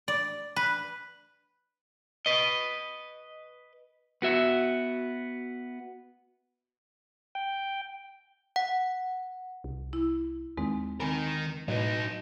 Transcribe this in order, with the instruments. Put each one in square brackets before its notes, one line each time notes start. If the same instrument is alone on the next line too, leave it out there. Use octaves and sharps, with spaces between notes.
[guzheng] D5
B4
[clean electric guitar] B4 D#5
B3 F#4 E5
[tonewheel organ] G5
[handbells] F#5
[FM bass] C2
[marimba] E4
[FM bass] D#2 [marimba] G#3 C4 D#4
[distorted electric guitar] D#3 A#4 [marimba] C4 G#5 B5
[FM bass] A2 [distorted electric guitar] F#3 D#4 [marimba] B4 D#5